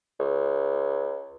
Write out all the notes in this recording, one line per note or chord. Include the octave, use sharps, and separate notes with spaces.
C#2